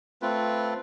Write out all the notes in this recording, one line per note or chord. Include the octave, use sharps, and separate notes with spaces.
A3 C4 F4 B4